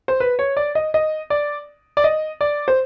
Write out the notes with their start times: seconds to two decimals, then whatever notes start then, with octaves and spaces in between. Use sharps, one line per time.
0.08 C5
0.20 B4
0.39 C#5
0.57 D5
0.75 D#5
0.94 D#5
1.30 D5
1.97 D5
2.04 D#5
2.41 D5
2.68 C5